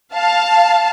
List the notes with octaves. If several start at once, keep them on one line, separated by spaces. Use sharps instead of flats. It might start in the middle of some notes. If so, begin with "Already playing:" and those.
F5 A5